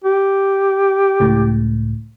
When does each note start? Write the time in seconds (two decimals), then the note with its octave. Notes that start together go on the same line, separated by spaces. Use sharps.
0.04 G4
1.20 C#2 A2